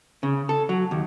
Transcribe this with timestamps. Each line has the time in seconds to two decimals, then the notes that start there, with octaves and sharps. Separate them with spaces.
0.23 C#3
0.49 A4
0.69 F#3
0.91 D#2